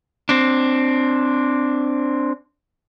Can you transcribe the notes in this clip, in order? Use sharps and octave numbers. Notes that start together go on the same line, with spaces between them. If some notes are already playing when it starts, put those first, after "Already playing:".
C4 D4